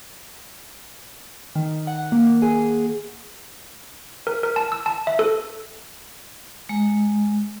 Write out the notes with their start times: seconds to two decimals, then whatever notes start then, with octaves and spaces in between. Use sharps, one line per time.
1.56 D#3
1.87 F#5
2.12 A#3
2.42 G#4
4.27 A#4
4.43 A#4
4.56 A5
4.72 E6
4.86 A5
5.07 E5
5.19 A4
6.69 G#3